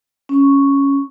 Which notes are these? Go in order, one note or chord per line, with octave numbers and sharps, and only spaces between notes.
C#4 C#6